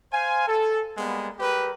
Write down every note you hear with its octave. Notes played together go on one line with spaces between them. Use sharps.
C5 F5 G#5
A4
G3 G#3 A#3 B3
G3 G4 G#4 A#4 B4